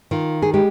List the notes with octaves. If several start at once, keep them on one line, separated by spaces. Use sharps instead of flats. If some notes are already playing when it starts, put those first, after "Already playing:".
D#3 F4
G#4
G#3 G4